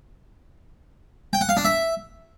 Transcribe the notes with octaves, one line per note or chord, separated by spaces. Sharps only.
G5
F#5
F5
D4
E5